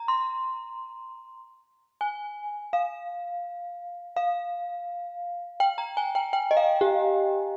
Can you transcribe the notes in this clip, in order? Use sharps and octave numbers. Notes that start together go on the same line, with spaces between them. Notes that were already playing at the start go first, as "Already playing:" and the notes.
Already playing: A#5
C6
G#5
F5
F5
G5
A#5
G#5
G5
G5
D#5
F5
G4